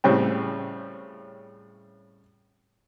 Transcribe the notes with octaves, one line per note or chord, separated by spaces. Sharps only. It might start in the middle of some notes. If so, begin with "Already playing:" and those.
A2 C#3 G3 C4